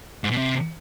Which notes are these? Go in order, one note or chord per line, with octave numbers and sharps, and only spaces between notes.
G#2
B2
C3